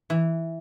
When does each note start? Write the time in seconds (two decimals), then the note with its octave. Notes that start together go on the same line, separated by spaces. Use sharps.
0.10 E3